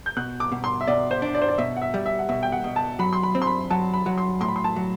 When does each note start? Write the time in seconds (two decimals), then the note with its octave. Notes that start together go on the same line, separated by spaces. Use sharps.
0.06 G6
0.17 B2 F#6
0.40 D6
0.52 B2
0.64 C6
0.81 E5
0.87 B2 D5
1.11 C5
1.22 D4
1.35 D5
1.42 C5
1.49 D5
1.58 B2 E5
1.77 F#5
1.82 E5
1.94 G3
2.06 E5
2.19 F#5
2.29 B2 E5
2.43 G5
2.52 F#5
2.64 B2
2.76 A5
2.99 F#3 B5
3.13 C6
3.23 B5
3.35 C4
3.42 C6
3.47 B5
3.70 F#3 A5
3.94 B5
4.06 F#3
4.18 C6
4.41 A2 C6
4.48 B5
4.56 C6
4.64 A5
4.76 F#3